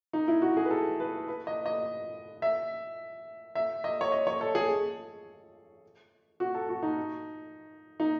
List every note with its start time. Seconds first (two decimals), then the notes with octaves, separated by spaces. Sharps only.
0.13 D#4
0.28 E4
0.42 F#4
0.57 G#4
0.65 B4
0.71 A4
1.00 B4
1.28 B4
1.47 D#5
1.66 D#5
2.42 E5
3.55 E5
3.84 D#5
4.01 C#5
4.12 D#5
4.27 C#5
4.41 A4
4.55 G#4
6.40 F#4
6.55 A4
6.69 F#4
6.83 D#4
8.00 D#4